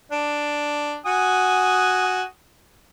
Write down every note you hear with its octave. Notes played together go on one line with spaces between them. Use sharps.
D4
F#4 G#5 D#6